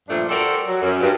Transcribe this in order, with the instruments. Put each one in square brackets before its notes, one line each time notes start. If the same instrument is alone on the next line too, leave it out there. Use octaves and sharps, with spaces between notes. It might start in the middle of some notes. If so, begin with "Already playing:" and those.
[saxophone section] G2 A#2 F3 A3 D4
F#4 G4 A4 A#4 C5 D5
F#3
F#2
G2